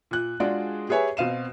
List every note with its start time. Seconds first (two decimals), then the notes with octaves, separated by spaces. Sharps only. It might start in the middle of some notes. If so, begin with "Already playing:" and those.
0.11 A#2 F#6
0.40 G#3 D4 F4 F#4 G#4 D5
0.89 G4 G#4 B4 C#5 E5 G#5
1.17 B2 C4 F5 D#7 E7